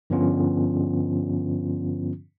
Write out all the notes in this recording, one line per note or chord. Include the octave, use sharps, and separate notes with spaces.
G2 D3 F3 B3 C#4 F4